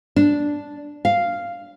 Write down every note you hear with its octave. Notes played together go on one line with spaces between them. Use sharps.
D4
F5